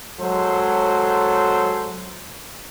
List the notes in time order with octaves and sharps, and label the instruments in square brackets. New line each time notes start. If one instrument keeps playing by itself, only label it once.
[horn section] F#3 G#3 A4 C5